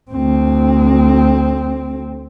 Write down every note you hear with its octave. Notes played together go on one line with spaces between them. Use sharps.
D2 C4